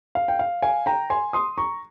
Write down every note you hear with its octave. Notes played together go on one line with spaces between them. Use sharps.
F5
G5
F5
F5 G#5
G5 A#5
G#5 C6
C6 D#6
A#5 C#6